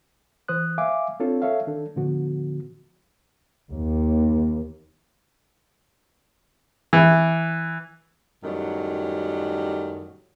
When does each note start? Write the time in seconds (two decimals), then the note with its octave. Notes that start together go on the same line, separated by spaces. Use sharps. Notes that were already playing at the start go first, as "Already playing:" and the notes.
0.48 E3 C5 D#6 F#6
0.78 E5 F5 G#5 D6
1.20 C4 D4 F4 A4 C#5
1.42 A4 C#5 E5 F5
1.67 D#3 D4 A4
1.96 A2 D3 F3 B3 F#4
3.70 D#2
6.93 E3
8.44 F#2 A2 D#3 F#3 G3